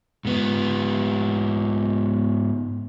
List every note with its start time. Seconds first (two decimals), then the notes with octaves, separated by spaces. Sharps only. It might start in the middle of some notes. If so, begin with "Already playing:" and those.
0.25 G#2 B3